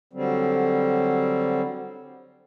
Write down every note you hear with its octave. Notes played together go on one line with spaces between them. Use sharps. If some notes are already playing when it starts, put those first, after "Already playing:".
D3 F#3 G3 C4